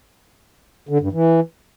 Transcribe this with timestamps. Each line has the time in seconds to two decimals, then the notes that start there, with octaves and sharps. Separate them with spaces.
0.89 D3
1.01 G2
1.13 E3